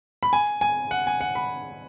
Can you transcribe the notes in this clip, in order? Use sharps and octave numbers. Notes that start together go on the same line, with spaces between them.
B5
G#5
G#5
F#5
G#5
F#5
B5